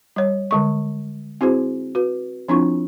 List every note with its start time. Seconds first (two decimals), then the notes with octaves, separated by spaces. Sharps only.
0.16 G3 C#5
0.51 D3 G#3 C#6
1.41 C4 E4 F#4 G#4 C5
1.95 F#4 B4
2.48 F3 C4 D4 E4 F4 C#6